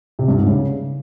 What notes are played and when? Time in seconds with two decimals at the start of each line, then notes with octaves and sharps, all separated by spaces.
0.19 C3
0.28 G2
0.37 G#2
0.47 C#3